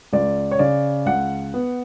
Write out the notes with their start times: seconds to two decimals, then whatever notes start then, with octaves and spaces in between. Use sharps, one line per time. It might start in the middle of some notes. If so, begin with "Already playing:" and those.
0.13 C#2 D5
0.51 C#5
0.59 C#3 D5
1.06 C#2 F#5
1.54 B3